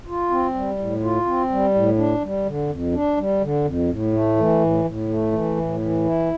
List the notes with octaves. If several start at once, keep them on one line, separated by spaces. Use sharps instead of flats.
F4
C4
G3
A2
F4
C4
G3
A2
D4
G3
D3
F2
D4
G3
D3
F2
A2
A3
E3
A2
A2
A3
E3
A2
E3
E4